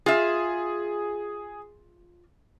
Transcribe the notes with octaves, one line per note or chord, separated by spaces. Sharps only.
F4 G#4 E5